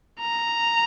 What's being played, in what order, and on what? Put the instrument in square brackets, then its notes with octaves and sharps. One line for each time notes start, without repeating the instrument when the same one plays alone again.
[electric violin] A#5